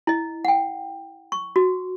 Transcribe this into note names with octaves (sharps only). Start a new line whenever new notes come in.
E4 D#5
F#5 G5
C#6
F#4